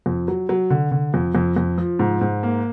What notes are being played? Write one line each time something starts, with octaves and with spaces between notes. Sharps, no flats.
F2
F#3
F#3
D3
D3
F2
F2
F2
F3
G#2
G#2
A#3